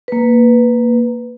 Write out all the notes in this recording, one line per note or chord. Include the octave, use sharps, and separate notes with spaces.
A#3 B4